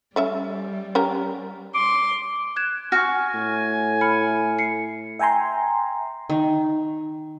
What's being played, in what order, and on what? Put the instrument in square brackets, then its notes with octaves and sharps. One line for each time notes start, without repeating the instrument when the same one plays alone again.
[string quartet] G3 [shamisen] A3 C#4 E5
[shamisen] C#4 G4 A#4
[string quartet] C6 [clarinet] D6
[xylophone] F#6 G#6 E7
[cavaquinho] F#4 [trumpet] G#5 [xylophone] C#6 F6
[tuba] A2
[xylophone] B5 F6 C#7
C7 C#7
[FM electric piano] E5 G5 G#5 A#5 C6
[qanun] D#3